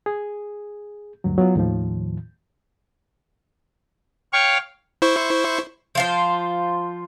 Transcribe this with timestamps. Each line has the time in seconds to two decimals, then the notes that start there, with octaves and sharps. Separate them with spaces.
0.06 G#4
1.24 D2 G2 F#3
1.38 F#3 B3 F4
1.56 D#2 A2 D#3 F3
4.33 C#5 F5 G5 C#6
5.02 E4 C5 C#6
5.95 F3 F4 C5